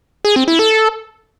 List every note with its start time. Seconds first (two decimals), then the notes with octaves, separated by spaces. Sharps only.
0.25 G#4
0.36 C4
0.48 E4
0.59 A4